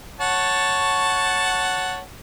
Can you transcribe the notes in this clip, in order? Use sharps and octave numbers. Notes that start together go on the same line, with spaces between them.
C#5 F#5 A5